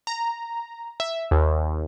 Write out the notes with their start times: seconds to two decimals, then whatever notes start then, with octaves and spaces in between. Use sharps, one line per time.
0.07 A#5
1.00 E5
1.31 D#2